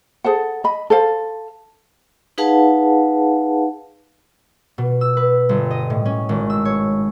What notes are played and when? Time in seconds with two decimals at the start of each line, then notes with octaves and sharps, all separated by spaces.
0.24 G#4 A4 C5 F#5
0.64 D#5 B5
0.90 A4 C5 F5
2.38 D#4 G#4 B4 F5 F#5 A5
4.78 B2
5.01 E6
5.17 B4
5.49 G1
5.71 D#5
5.90 A2
6.05 C#4
6.29 G#1
6.50 E6
6.65 C#5